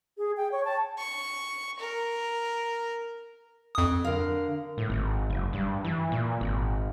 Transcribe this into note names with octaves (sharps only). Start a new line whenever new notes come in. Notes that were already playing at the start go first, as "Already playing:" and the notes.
G#4
G5
C#5
A5
C#6
A#4
F2 D#6
D3 A#4 F5
A2
G#1
F#1
G2
E3
A#2
G#1